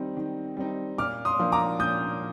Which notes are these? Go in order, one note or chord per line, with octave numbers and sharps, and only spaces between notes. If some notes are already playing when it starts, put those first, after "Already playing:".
Already playing: D#3 G3 C4 D#4
D#3
G3 C4 D#4
A#2 D6 F6
C6 D#6
F3 A#3 D4
A#5 D6
A#2 D#6 G6